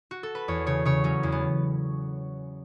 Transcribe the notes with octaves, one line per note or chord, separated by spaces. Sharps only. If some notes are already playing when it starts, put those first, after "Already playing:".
F#4
A4
B4
E2 C#5
C#3 C#5
C#3 C#5
F#3 C#4
E2
B3